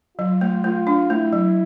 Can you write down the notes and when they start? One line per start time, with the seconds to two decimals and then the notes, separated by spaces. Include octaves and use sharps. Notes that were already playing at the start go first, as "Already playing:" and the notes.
0.18 F#3 F4
0.41 A3
0.64 A3 F4
0.87 D4
1.10 A3 E4
1.33 F#3